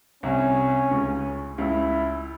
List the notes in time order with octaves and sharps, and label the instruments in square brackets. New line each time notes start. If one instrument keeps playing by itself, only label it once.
[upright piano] C2 C3 [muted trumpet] C#4
[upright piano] C#2 C#3
[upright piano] C#2 C#3 [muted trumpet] E4